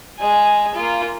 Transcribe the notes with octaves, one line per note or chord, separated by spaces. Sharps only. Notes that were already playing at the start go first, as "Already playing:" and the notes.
G#3 G#5
A#3 F4